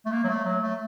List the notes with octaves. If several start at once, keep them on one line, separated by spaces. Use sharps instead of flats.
A3
A#3
F#3
A3
F#3
A3